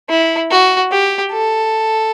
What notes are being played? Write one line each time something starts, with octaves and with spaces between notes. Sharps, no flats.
E4
F#4
G4
A4